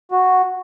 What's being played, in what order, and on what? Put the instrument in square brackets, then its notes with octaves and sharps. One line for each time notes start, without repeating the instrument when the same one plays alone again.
[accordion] F#4